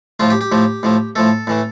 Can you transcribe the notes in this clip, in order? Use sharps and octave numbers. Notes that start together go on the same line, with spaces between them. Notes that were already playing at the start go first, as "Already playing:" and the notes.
A2 F3 A3 F4
G4
G4
A2 F3 A3
A2 F3 A3
A2 F3 A3 A4
A2 E3 A3